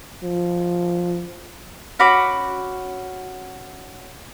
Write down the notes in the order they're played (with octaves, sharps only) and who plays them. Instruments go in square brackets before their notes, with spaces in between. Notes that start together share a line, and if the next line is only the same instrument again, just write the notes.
[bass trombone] F3
[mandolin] C#4 F#4 B5 D6